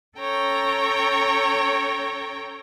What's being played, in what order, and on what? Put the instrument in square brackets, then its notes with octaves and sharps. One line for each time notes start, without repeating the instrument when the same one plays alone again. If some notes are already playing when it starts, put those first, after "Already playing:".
[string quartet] C#4 A4 C#5 G5 A#5